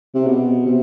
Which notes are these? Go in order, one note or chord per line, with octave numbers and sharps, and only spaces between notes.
C3
B2
C3